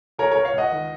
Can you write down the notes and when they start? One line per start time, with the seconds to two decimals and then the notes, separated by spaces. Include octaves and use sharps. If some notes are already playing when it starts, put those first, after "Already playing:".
0.19 C#2 A#4 C#5
0.31 A#4 C#5
0.36 C#2
0.45 C#5 F5
0.54 C#2 D#5 F#5
0.71 D#3